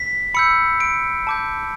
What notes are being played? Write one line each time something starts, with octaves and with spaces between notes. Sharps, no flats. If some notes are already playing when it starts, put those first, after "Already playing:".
Already playing: B6
B5 E6 G6 C#7
D7
A5 D6 G6